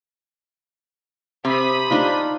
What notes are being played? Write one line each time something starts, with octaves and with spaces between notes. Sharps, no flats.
C3 C5 B5 D#6
D4 D#4 F4